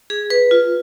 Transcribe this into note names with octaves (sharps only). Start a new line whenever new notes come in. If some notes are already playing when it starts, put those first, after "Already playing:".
G#4
B4
F4